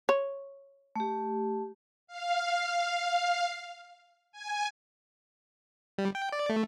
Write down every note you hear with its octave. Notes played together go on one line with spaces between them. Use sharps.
C#5
A3 G4
F5
G#5
G3
G5
D5
A3